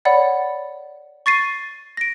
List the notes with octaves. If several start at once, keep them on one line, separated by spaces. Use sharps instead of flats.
C#5 D5 F#5 B5
C#6 A6 C7 D#7
A#6 D7